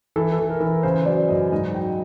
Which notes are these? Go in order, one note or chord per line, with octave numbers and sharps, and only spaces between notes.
E3 A4
A4
E3
A#4
E3
A#4
C#3 C5
F#3 D5
F#2 D#5
G#2 D#5
F#3 G5